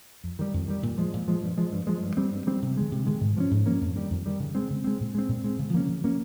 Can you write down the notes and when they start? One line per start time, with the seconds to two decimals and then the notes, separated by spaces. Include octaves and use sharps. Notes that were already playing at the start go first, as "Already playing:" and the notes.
0.24 F2
0.39 D#3 G3
0.53 F2
0.68 D#3 G3
0.83 A#2
0.98 F3 G#3
1.13 A#2
1.28 F3 G#3
1.43 G2
1.58 F3 G#3
1.72 G2
1.87 F3 G#3
2.03 G2
2.17 G3 C4
2.32 G2
2.47 G3 C4
2.62 C3
2.77 D#3 G#3
2.92 C3
3.07 D#3 G#3
3.21 G#2
3.37 F3 A#3 C#4
3.51 G#2
3.66 F3 A#3 C#4
3.81 F2
3.96 D#3 G3
4.10 F2
4.26 D#3 G3
4.40 C#3
4.55 G#3 C4
4.70 C#3
4.84 G#3 C4
5.00 A#2
5.15 G#3 C4
5.29 A#2
5.44 G#3 C4
5.59 C#3
5.74 F3 A#3 C#4
5.89 C#3
6.04 F3 A#3 C#4